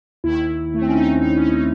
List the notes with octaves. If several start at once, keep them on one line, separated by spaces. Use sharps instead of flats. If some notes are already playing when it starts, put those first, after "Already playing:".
D#2 D#3 E4
A3
C4
C#4
D#4
D#4
C#4
D#4